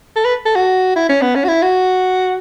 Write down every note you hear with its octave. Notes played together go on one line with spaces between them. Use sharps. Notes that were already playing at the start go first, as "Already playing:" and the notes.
A4
B4
A4
F#4
E4
C#4
B3
C#4
F#4
E4
F#4